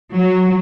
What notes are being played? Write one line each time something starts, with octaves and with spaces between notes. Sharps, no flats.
F#3